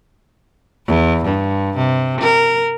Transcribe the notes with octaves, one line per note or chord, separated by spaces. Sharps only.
E2
G2
C3
A#4